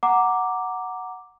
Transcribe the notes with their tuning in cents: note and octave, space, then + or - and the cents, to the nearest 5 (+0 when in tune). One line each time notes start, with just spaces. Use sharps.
F#5 +0 A#5 +0 D6 +0